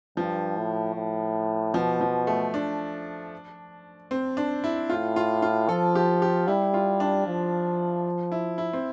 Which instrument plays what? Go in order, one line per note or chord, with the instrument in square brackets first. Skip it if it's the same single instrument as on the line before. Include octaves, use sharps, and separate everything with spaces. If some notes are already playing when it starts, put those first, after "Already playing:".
[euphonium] G2 [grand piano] F3
[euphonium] A2
A2
[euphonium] B2 [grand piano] F3
[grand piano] F3
A3
D4
C4
D4
E4
[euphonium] A2 [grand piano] F4
[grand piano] F4
F4
[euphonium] F3 [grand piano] A4
[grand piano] G4
G4
[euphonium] G3 [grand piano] E4
[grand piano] F4
D4
[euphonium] F3
[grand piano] E4
E4
C4